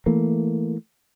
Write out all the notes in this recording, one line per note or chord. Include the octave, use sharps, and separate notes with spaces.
E3 A3 A#3